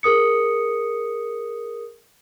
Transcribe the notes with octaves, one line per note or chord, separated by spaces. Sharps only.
G#4 A#4 D#6 C#7